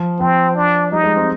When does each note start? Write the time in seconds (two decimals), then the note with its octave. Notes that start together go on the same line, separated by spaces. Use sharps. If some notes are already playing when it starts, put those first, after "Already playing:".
Already playing: F3
0.20 F3 C4
0.55 D4
0.92 G3 D#4
1.04 G#3
1.16 C4